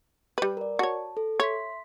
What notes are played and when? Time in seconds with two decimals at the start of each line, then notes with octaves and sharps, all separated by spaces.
0.38 G3 B4
0.57 A#4 D5
0.79 F#4 C#5 A5
1.17 A4
1.40 C#5 E5 C6 B6